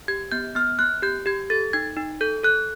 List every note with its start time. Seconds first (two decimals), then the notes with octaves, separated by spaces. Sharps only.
0.08 G4 G#6
0.32 B3 G6
0.55 B3 F6
0.79 B3 F#6
1.02 G4 G6
1.26 G4 G#6
1.50 A4 A6
1.73 D#4 G#6
1.96 D#4
2.21 A4 G6
2.44 A4 F#6